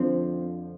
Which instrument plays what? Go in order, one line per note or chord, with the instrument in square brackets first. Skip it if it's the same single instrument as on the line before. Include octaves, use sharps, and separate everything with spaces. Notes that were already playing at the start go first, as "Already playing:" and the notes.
Already playing: [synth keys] F2 D3 F3 [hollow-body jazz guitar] C4